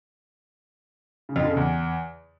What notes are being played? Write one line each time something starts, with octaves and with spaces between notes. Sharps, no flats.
C#3
F2
D3
C#3
E2